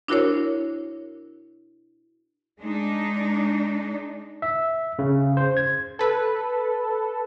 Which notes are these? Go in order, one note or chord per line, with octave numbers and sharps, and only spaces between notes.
D4 E4 F#4 A#4 C5 C#5
G#3 D4 D#4
E5
C#3
C5
G#6
A4 B4